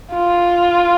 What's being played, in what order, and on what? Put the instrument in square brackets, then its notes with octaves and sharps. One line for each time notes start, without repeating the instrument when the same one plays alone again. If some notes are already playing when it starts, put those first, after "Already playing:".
[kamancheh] F4